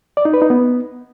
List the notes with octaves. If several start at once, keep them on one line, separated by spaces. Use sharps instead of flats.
D5
D#4
B4
D#4
B3